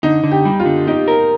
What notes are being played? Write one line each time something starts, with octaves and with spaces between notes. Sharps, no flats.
D3 D#4
D3
G4
G3
F4
D3
D#4 G4
A#4